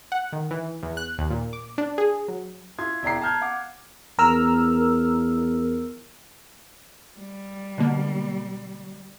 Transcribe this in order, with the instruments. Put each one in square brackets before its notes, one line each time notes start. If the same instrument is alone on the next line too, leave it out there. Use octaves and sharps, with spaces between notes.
[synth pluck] F#5
D#3
E3
E2
F#6
D#2
A#2
D6
D4
G#4
F#3
[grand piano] E4 F4 C6 G#6
E1 E4 D5 G5 A#5 C7
A5 A#5 F6 G6 G#6
F5 F#5 D6
[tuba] E2 [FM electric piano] A#4 E6 F6
[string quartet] G3
[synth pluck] B2 D3 A#3